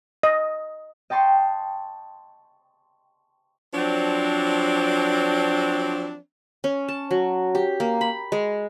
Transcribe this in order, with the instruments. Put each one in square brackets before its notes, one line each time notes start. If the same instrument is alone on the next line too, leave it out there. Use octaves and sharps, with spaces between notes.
[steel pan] D#5
[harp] D#5 G5 A5 C6 C#6
[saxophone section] F3 F#3 C4 D4
[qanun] C#4
A5
F#3
G4
A#3
B5
G#3